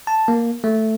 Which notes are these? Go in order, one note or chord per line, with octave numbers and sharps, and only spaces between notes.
A5
A#3
A3